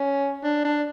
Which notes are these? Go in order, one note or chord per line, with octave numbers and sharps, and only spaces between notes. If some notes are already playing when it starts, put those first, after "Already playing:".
Already playing: C#4
D4
D4